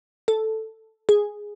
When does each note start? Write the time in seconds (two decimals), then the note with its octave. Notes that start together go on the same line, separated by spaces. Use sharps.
0.28 A4
1.09 G#4